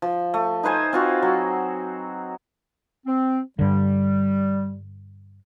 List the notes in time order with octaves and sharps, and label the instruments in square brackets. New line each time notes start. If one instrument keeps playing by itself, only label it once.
[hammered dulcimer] F3
A3
D#4 B4 C5 G#5
C4 F4 F#4
F#3
[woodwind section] C4
[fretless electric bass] G2 D3 [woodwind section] G3